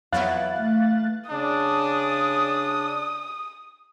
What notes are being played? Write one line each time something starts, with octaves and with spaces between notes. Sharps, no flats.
F2 E3 F#3 B3 E4 F5 F#6 A6
A3
C#3 D4 D#6